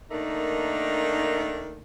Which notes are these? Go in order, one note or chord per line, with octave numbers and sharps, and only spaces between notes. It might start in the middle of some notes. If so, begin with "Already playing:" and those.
D#3 A3 A#3 D4 D#4